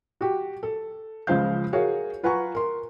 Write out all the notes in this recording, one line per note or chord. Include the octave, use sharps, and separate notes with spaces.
F#4 G4
A4
C#2 C#3 F3 C5 F5 G6
F#4 G#4 A#4 C#5 F5
F4 B4 F#5 G#5 A#5 C#6
A#4 C6